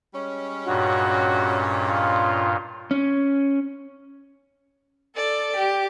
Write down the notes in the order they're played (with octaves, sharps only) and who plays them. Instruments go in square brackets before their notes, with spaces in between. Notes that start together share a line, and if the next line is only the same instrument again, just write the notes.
[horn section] G3 G#3 C#4
[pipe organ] G2 A#2 [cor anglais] F#4
[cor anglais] F4
[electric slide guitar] C#4
[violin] A4 D5
G4